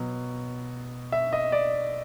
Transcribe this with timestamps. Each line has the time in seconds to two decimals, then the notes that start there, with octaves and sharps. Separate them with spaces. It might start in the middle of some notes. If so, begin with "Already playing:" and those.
Already playing: B2 F#3
1.12 E5
1.33 D#5
1.52 D5